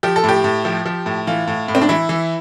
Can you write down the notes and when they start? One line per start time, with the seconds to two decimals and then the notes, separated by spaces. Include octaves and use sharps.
0.03 F3 G4
0.16 A4
0.24 A2 G4
0.44 A2
0.65 F3
0.86 F3
1.06 A2
1.27 E3 F4
1.47 A2
1.68 A2
1.75 C4
1.82 D4
1.89 E3 E4
2.09 E3